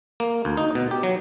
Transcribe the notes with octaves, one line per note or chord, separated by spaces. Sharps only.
A#3
D2
D#4
B2
G4
F#3